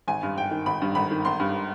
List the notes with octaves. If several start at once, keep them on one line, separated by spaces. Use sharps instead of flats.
G#1 G#5
G2
G#1 G5
D#3
G#1 B5
G2
G#1 B5
D#3
G#1 C6
G2